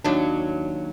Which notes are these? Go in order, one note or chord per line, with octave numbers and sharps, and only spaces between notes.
D#2 F#3 D4